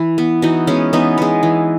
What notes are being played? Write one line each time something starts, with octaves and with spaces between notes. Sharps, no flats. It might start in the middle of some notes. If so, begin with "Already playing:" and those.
Already playing: E3 E4
B3
E3 D#4 F#4
G#3 B3 C#4
E3 B3 D#4
G#3 B3
E3